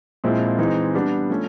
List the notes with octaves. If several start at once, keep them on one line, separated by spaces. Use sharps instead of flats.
A#2 F3 G#3 C4 E4
E3 G#3 C4 D#4
G3 B3 D4
F3 A3 C#4